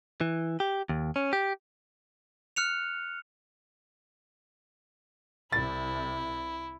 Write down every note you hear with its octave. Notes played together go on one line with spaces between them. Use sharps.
E3
G4
D#2
C#4
G4
F6 F#6 C#7 F7
C2 C3 E4 A6